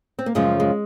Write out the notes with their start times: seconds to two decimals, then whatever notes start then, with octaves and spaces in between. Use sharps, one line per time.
0.19 C4
0.26 A#3
0.35 F#2 C#3 F3 G#3
0.60 G#3